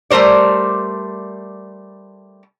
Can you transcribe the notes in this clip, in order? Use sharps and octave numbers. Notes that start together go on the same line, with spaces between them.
G3 A3 A#4 C5 D5